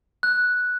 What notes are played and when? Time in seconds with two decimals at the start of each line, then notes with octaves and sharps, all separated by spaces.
0.23 F#6